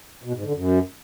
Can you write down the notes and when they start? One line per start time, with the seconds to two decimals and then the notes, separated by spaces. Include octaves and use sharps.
0.24 B2
0.34 G#2
0.44 D3
0.54 F#2